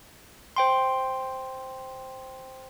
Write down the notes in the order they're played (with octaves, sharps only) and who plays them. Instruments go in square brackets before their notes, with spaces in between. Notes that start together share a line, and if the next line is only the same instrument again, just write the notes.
[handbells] C5 G5 C6